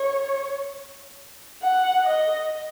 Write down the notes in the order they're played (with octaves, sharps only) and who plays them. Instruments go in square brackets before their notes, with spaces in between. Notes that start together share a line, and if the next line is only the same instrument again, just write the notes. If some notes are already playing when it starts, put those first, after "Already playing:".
Already playing: [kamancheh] C#5
F#5
D#5